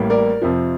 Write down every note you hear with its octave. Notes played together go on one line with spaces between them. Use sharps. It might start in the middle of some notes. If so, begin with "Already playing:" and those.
Already playing: A1 A2 G3 A#3
A#4 D5
F2 C3 F3